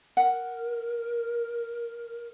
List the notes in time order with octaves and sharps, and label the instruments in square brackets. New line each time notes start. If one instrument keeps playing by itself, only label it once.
[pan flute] A#4 [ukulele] F#5